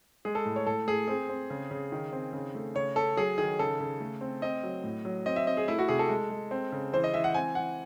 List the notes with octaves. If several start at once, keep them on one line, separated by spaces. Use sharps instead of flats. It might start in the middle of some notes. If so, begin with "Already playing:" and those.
G#3 G#4
A4
A2
C#5
A2 A4
A2 G#4
C4 G#4
C4
C#3
C#3
D#3
C4
C#3
A3
C#3 C#5
C#4 A4
F#3 G#4
D#3 G#4
C#3 A4
C#3
A3
C4
C4 D#5
F#3
A2
F#3
C4 D#5
E5
C4 D#5
G#4
A3 E4
F#4
C3 G#4
A4
G#3
G#3
C4
C#3
E3 C5
D#5
E3 E5
F#5
C4 G#5
E3 F#5